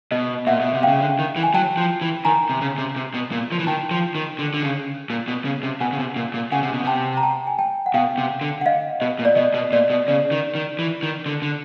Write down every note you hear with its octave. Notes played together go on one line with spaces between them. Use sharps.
B2 D#5
A#2 E5 F#5
B2
C3
C#3 F5 G5
D3
D#3
E3
G#5
F#3 G5 A5
F3
E3
D#3 G#5 A#5
C3
C#3
C3
C3
B2
A#2
F3
E3
D#3 G5 A5
F3
D#3
D3
D3
C#3
A#2
B2
C#3
C3
B2 F#5 G#5
C#3
C3
A#2
A#2
C#3 F#5 G#5
C3
B2
C3 G5 A5
A#5
G5 A5
G#5
G5 A5
F#5
B2 F5 G5
C3
D3
F#5
D#5 F5
B2 D#5
A#2
D5
B2 D#5
B2
A#2 D5
B2
C#3 D5
D#3
D#3
E3
D#3
D3
D3